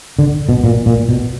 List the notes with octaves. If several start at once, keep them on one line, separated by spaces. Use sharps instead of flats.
D3
B2
A#2
A#2
B2